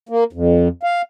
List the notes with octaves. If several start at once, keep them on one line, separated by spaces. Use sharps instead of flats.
A#3
F2
F5